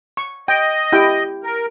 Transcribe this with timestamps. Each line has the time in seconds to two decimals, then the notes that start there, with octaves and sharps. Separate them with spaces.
0.17 C#6
0.48 D#5 G5
0.92 E4 G4 G5
1.44 A#4